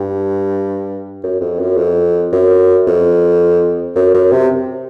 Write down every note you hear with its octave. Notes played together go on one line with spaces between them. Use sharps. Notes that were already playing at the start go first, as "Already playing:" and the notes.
Already playing: G2
F#2
F2
F#2
F2
F#2
F2
F#2
F#2
C3